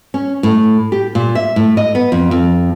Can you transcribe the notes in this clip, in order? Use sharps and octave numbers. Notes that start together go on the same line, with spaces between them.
C#4
A2
G4
A#2
E5
A2
D#5
B3
F2
F2